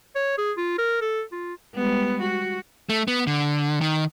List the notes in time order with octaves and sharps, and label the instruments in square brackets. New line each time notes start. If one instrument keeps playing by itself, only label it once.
[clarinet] C#5
G#4
F4
A#4
A4
F4
[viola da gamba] G3 G#3 B3
F#4
[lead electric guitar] A3
B3
D3
D#3